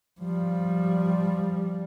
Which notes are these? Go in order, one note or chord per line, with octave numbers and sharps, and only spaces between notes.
F3 G3